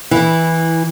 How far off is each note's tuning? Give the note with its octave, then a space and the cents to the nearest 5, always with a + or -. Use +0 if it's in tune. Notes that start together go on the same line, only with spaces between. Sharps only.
E3 -10 E4 +0